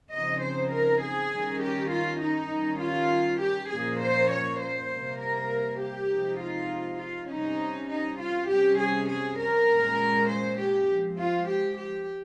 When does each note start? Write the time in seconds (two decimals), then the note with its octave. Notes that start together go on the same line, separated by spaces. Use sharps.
0.12 C#3 F3 C4 D#4 D#5
0.41 C5
0.71 A#4
1.02 G#4
1.32 D#3 G3 C#4
1.61 G4
1.91 F4
2.21 D#4
2.52 D#3 G3 C#4
2.80 F4
3.40 G4
3.70 A#2 F3 A#3 C#4 G#4
4.01 C5
4.31 C#5
4.60 C5
4.90 C3 G3 A#3
5.20 A#4
5.79 G4
6.09 C3 F3 G#3 D#4
6.39 F4
6.99 F4
7.29 C3 G3 C#4 D#4
7.89 D#4
8.19 F4
8.48 C3 G3 C#4 G4
8.78 G#4
9.09 G#4
9.38 A#4
9.68 A#2 G#3 C#4
10.28 C5
10.58 G4
10.88 F3 G#3 C4
11.18 F4
11.48 G4
11.78 G4